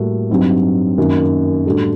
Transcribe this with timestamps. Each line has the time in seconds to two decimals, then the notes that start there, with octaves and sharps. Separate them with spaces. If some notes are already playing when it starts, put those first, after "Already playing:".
Already playing: A2 G3 A#3 F#4 A4
0.30 G2 F#3 C4 D#4
0.98 F#2 D#3 F#3 A#3 F#4
1.66 A2 G3 D4 F#4 A4